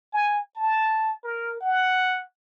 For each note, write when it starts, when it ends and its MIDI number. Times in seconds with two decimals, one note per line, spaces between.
0.13 0.39 80
0.55 1.13 81
1.23 1.55 70
1.60 2.22 78